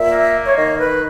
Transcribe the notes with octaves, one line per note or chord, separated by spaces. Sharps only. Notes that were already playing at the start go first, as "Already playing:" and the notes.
Already playing: A#2 E5
A#3
C#5
D#3 D#5
B4